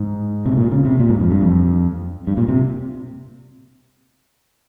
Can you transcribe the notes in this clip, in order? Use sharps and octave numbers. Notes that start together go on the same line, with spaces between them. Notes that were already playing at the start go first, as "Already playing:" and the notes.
Already playing: G#2
C3
A#2
C#3
C3
A#2
G#2
F2
G2
F2
G2
A#2
C3